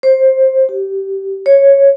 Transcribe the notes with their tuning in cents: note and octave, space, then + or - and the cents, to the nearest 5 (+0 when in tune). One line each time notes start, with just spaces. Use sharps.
C5 +15
G4 -15
C#5 -5